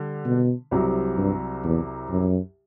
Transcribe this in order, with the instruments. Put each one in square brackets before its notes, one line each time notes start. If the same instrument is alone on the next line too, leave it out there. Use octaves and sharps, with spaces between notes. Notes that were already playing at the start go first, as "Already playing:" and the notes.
Already playing: [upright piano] D3 G3
[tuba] B2
[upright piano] C2 C3 F#3
[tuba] G2
E2
F#2